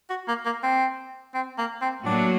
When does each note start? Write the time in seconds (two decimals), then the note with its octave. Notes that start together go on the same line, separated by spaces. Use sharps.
0.10 F#4
0.28 A#3
0.45 A#3
0.63 C4
1.34 C4
1.58 A#3
1.82 C4
2.05 A2 F#3 A#3 D4 F#4